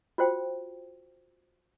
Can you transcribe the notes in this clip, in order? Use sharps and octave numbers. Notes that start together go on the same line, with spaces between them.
F4 F#4 C5 G5